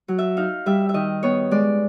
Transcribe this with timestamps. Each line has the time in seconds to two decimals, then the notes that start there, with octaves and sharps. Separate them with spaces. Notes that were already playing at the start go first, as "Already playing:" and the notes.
0.08 F#3
0.18 E5
0.37 D#4 F5
0.66 G3 E5
0.89 E5
0.94 D#3 D#5
1.23 B3 C#5
1.51 G#3 D5